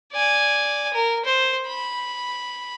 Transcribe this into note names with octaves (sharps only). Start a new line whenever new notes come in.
D5 G#5
A#4
C5
B5